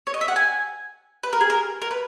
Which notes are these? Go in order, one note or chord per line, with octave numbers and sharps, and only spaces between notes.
C#5
D#5
E5
F#5
G#5
B4
A#4
G#4
A#4
A#4
B4